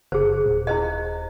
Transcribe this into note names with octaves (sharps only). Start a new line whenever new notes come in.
F#1 G#4 C5
D#1
E4 C5 D#5